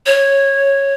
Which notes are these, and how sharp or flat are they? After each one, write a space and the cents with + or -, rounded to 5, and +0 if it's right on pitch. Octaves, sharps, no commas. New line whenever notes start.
C#5 -10